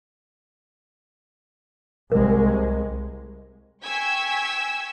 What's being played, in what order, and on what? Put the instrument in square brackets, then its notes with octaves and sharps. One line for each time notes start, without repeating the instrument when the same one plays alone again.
[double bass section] C2 G#3 [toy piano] A#4
[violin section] G5 G#5 C#6 E6 G#6 B6